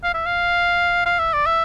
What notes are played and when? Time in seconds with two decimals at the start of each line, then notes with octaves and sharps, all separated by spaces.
0.04 F5
0.14 E5
0.26 F5
1.06 F5
1.19 E5
1.34 D5
1.46 E5